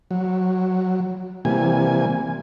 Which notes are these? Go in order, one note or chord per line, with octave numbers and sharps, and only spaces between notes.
F#3
C3 E3 G3 A#3 G#5